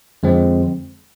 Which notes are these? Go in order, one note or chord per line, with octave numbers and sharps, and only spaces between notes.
F2 D3 F3 G#3 C4